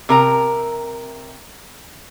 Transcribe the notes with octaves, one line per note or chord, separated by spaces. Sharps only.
C3 A#4 A#5